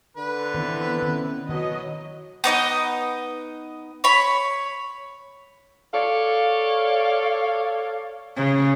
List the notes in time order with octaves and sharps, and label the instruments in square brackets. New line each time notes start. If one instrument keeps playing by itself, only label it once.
[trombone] D3 [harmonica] B4
[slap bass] D#3 E3 [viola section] B3 C4 E4
[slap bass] D#3 C#4
[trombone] B2 [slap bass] D#3 [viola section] F#3 D#5
[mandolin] B3 D#4 D5 D#5
C#5 B5
[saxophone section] A4 C#5 D5 F5
[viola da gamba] C#3